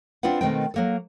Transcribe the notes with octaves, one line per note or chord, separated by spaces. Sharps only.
C4 D4 F4 B4 F#5
B2 D#3 A3 C4 A#4 G5
F#3 A#3 A4